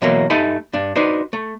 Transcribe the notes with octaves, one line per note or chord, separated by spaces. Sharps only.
B2 D3 E3 F#3 A#3
G2 A3 D#4 A4 G#5 B5
G2 D4
D4 D#4 F#4 B4 C5
A3